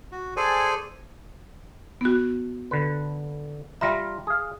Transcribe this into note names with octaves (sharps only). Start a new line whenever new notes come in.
F#4
G#4 A4 C5 D5 G#5
B3 F#4
D3 B4
G3 F4 E5 A#5 B5
G#4 F5